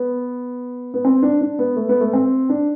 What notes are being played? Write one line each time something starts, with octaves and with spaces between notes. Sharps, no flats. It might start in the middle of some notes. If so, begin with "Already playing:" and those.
Already playing: B3
B3
C4
D4
D4
B3
A3
B3
A3
C4
D4